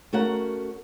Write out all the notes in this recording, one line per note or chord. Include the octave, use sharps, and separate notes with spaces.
A3 C#4 F#4 A#4 C#5 F#5